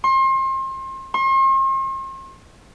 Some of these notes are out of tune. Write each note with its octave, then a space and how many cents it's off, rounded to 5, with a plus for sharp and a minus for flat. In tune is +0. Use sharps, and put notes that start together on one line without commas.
C6 +35
C6 +45